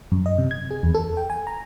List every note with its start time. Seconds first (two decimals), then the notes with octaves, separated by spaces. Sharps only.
0.12 F#2
0.26 D#5
0.38 C3
0.51 G#6
0.71 G#4
0.83 E2
0.95 A4
1.17 G5
1.30 G#5
1.47 A#5